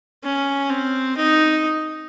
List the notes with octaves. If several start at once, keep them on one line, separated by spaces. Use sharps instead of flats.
C#4
C4
D#4